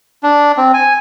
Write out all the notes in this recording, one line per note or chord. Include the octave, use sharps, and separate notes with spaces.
D4
C4
G#5